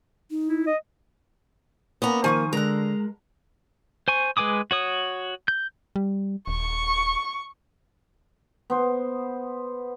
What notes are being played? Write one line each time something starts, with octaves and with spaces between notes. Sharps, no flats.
D#4
E4
D#5
A#3 B3 C#4 A#5
D#3 F3 G#5 C#6 D#6
D3 G#3 A#4 A#5 F#6
C5 G#5 C#6
G#3 B4 G#5 D6 D#6
F#4 C#5 D#6
G6
G3
D#1 C#6
B3 C5